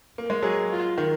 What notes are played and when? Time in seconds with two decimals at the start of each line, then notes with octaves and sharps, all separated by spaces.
0.18 A#3
0.30 G#3
0.42 F#3 G#4
0.73 F4
0.98 D#3